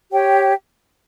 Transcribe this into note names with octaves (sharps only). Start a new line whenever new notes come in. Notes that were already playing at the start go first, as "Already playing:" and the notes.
G4 C#5 G5